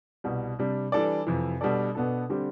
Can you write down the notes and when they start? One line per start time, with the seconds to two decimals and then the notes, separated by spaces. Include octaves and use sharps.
0.24 C2 B2 G3
0.59 C3 G3 D4
0.92 E3 G3 D4 A4 D5
1.27 F2 C3 E3
1.61 B2 G3 D4 A4 D5
1.95 B2 B3 D4 A4
2.30 D3 G3 C4 G4